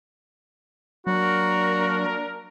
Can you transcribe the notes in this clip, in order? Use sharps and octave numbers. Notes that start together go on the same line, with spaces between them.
F#3 A#3 D4 F#4 A#4